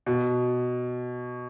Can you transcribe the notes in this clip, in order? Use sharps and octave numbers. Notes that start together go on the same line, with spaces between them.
B2